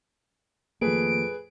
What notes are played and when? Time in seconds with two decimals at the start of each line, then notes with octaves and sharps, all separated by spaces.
0.81 F2 D#3 A3 A#3 G#4 B4 D7